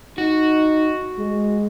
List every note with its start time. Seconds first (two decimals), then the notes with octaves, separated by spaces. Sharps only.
0.18 D#4 F#4
1.18 G#3